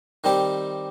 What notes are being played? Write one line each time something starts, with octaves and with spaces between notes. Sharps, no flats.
D#3 G3 C4 G4